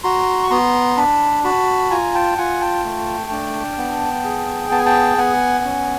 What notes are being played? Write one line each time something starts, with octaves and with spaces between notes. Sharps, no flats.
F#4 A#5 C6
C#6
B3 A#5 C6
D4 A5 B5
F#4 A5 B5
F4 G#5 A#5
G5 A5
F4 F#5 G#5
G5 A5
A3
D4
B3
G#4
B3 A5
G#5
G5 A5
B3 F#5 G#5
C#4